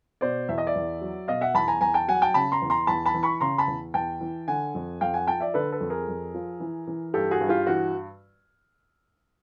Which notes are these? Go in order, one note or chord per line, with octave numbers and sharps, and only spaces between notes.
B2 C5 D5
E2 E5
D#5
D5 E5
E2
F#3
B2 D#5 F5
E5 F#5
E2 A5 B5
G#5 A#5
E2 G#5 A#5
G5 A5
F#3 F#5 G#5
G5 A5
C#3 A5 B5
A#5 C6
E2
A#5 C6
E2 A5 B5
A5 B5
E3
B5 C#6
C#3 A#5 C6
A5 B5
E2
E2 G5 A5
E3
D3 F#5 G#5
F2
F2 F5 G5
F#5 G#5
F3 G5 A5
D5 E5
D3 A4 B4
A4 B4
F2
G#4 A#4
F2
F3
E3
E3
G2 G4 A4
F#4 G#4
G2
F4 G4
E3 F#4